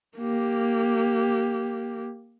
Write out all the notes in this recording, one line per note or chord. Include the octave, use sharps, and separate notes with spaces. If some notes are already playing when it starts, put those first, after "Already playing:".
A#3 G4